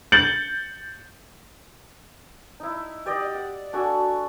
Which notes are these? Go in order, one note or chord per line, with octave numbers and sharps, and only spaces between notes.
G6 A6 C#7 F#7
D#4 E4
G4 D5 D#5 F#5
F#5
D4 F#4 A4 G#5